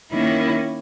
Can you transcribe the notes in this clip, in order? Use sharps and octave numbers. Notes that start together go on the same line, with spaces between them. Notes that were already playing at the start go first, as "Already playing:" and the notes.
D#3 A#3 C#4 E4